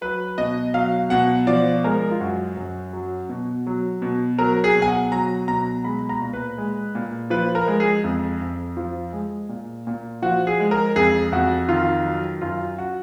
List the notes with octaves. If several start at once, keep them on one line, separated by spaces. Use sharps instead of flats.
F#3 B4
B2 D#5
F#3 F5
B2 F#5
F3 D5
G#3 A#4
F4
F#2 F#4
F#2
F#3
B2
F#3
B2
F#3 A#4
G#4
B2
G#5
F#5
F#3 A#5
B2 A#5
G#3 B5
A#5
A#2
B4
G#3
A#2
F3 B4
A#4
G#3
G#4
F2
F2
F3
G#3
A#2
A#2
F3 F#4
G#4
G#3
A#4
F2 G#4
F2 F#4
D#3 F4
F#3
F#2 F4
F#4